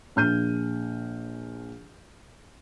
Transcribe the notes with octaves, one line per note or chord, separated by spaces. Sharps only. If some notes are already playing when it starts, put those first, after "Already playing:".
A#1 F6 G6 D#7